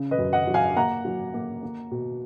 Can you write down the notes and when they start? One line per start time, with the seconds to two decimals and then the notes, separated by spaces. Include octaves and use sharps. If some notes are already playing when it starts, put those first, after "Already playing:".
Already playing: C#3
0.11 B4 D#5
0.18 F#2
0.33 D#5 F#5
0.47 F#3
0.54 F5 G#5
0.76 A#3 F#5 A#5
1.05 F#3
1.34 A#3
1.63 A#3
1.91 B2